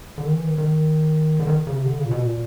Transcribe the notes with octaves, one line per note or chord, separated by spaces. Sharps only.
D3
D#3
E3
D#3
D#3
D3
D#3
C#3
C3
D3
C#3
A#2
B2
A#2